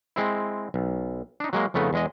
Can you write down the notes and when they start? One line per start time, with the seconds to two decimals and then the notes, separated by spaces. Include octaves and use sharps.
0.16 G#3 C4 E4
0.74 B1
1.40 D4 D#4
1.53 F#3 G#3 A#3
1.74 F2 C#3 A3 B3 D#4
1.93 E2 G#3 D#5